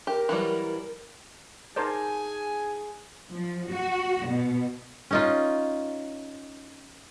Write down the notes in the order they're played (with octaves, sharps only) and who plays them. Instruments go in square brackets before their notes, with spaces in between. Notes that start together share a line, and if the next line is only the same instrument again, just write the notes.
[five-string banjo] G4 [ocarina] A#4
[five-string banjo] E3 F#3 G3
[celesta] D#4 A5 G6 [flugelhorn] G#4 [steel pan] A#4 C5 D5 [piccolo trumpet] G#5
[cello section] F3
F#4
B2
[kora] C#4 D#4 F4